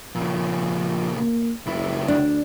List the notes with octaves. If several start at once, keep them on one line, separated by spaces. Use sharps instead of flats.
A#2 C#3 F3
A#3
F#1 C#2 E4
D2 D4